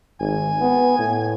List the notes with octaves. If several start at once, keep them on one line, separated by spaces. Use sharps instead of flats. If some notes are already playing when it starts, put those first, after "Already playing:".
G#1 G#5
B3
A2